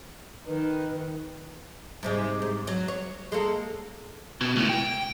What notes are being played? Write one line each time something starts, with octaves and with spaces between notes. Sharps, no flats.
D#3 B4
G#2 C3 G#3
G#2
F#3
C#5
G#3 A#3 A4
B2
C#2 A2
G5